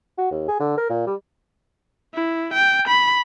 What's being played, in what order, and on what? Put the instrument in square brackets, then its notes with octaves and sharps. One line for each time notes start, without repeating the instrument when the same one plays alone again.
[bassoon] F#4
D#2
G#4
D3
A#4
A#2
G3
[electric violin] E4
G5
B5